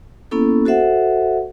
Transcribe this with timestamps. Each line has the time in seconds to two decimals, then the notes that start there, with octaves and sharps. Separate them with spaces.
0.31 A#3 B3 C#4 E4 A4
0.65 F#4 A4 C5 E5 F#5